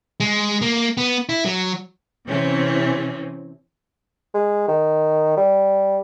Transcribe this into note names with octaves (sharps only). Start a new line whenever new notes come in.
G#3
A#3
B3
E4
F#3
C3 E3 C4 C#4
G#3
D#3
G3